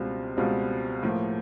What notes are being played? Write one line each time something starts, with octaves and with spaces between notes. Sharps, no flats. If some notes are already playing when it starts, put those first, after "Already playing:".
Already playing: C#2 B2 G3 C4 F4
C#2 B2 G3 C4 F4
A2 F3 A#3